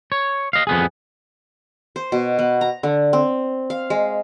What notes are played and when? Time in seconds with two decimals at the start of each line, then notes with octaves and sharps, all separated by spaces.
0.12 C#5
0.53 D#5 F5
0.67 F2 B3 G#4
1.96 C5
2.12 B2
2.39 B3
2.61 A#5
2.83 D3
3.13 C4
3.70 F5
3.90 G#3